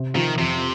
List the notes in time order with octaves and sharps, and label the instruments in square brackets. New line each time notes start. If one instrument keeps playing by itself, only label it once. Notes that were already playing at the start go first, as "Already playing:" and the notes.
Already playing: [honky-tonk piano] C3
[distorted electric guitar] D#3 [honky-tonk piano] F3
[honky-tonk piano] F2 [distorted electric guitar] C3